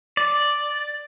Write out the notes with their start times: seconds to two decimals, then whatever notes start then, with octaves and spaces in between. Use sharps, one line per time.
0.17 D5